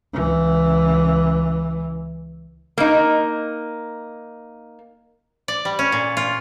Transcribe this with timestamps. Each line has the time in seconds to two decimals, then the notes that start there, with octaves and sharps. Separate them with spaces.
0.14 C#2 E3
2.78 A#3 D#4
5.48 D5
5.65 G3
5.79 C#4
5.92 A#2
6.17 F4